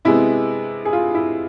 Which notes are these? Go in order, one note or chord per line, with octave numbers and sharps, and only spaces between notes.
C3 G#3 B3 E4
G#4
F4
E4